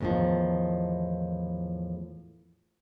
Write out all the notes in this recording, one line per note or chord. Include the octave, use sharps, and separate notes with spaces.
E2 A2 C3 D#3 F3